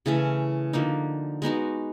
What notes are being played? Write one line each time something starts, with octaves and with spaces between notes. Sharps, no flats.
C#3 E3 A3 C#4
D3 F3 A#3 D#4
G#3 B3 D#4 F#4